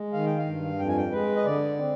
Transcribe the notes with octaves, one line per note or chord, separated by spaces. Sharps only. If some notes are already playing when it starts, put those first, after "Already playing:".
Already playing: G#3
D#3 F5
G5
F5
G2
F2 G5
G#5
G5
G#3 B4
D#5
D3 D5
C4